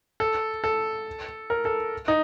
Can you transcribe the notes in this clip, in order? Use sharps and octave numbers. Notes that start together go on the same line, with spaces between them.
A4
A4
A#4
A4
D#4